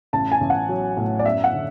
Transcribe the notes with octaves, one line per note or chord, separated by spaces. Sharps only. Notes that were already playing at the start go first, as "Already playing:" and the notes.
A1 A5
G#5
A1
F#5
F#3
A2
D5
F#2 E5
F#5
D3